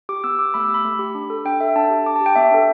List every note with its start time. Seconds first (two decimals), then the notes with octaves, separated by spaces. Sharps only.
0.09 G4 D6
0.24 B3 E6
0.39 G4 D6
0.54 A3 B5
0.60 E6
0.64 D6
0.69 G4
0.74 B5
0.85 A3
0.99 G4
1.15 D4
1.30 A4
1.45 D4 G5
1.60 A4 E5
1.75 D4 A5
1.90 G4
2.06 D4 D6
2.16 A5
2.21 G4
2.26 G5
2.36 B3 E5
2.51 D4 A4